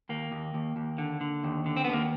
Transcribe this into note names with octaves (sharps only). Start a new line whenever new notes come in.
D#2 A#3
D#2
D#2
D#2
D3
D3
D#2
D3
C4
D#2 B3
A#3